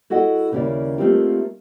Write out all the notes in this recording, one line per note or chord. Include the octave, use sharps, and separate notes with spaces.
E4 F#4 A4 D#5 F#5
D#2 C#3 A#3 C#4 E4 D5
A3 A#3 C4 D#4 F4 G4